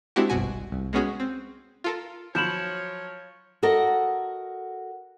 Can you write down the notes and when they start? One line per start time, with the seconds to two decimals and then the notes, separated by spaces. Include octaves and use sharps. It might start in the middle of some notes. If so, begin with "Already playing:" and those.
0.16 G#3 C4 D4 E4 F#4 G4
0.30 G1 C2 F#2 B2 F#4 G#5
0.72 C2
0.93 G#3 B3 C#4 F#4 G#4
1.20 C4
1.84 F4 A4 A#4
2.35 F3 F#3 C#5 B5 G6 E7 F#7
3.63 F#4 A4 A#4 D#5